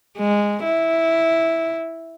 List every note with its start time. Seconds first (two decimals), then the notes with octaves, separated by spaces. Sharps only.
0.18 G#3
0.64 E4